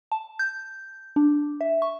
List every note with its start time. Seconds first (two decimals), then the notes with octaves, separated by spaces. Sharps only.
0.12 A5
0.39 G6
1.16 D4
1.61 E5
1.82 C#6